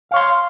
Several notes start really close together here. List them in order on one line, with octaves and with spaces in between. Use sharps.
F5 C#5 C6